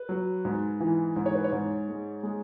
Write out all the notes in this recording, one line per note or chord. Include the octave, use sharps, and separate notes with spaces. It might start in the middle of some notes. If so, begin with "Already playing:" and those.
Already playing: B4
F#3
G#2
E3
G#2
C#5
B4
C#5
G#2
G#3
G#3